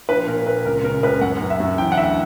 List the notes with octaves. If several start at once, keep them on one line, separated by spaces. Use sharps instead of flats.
A#1 B4
A#2 A#4
A#2 B4
C#2 A#4
C#3 A#4
C#2 B4
F#2 F#5
F#2
E5
F#2
E3 G5
F#5
D2 E5